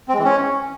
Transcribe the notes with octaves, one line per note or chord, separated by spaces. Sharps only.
C4
G#3
E3
C#4